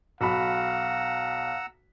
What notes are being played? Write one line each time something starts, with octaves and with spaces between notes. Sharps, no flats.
B1 F#4 F5 F#5 A#5 B5 E6